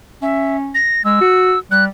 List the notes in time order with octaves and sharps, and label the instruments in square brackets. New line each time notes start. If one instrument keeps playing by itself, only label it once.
[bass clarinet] C#4 [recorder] E5
[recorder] A#6
[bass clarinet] G#3 [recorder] E6
[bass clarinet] F#4
[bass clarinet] G3 [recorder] F#6